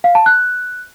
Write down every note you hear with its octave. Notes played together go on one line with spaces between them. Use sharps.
F5
A5
F#6